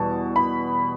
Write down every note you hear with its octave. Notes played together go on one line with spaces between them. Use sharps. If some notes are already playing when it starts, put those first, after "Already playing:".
Already playing: E2 B2 G3 A5
B5